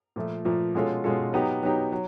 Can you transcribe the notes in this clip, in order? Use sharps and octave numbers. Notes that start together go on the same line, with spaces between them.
A#2 F3 A3
A#2 F3 A3
B2 G#3 C#4 F4 A4
B2 G#3 C#4 F4 A4
F#3 B3 D#4 G4
F#3 B3 D#4 G4
F#3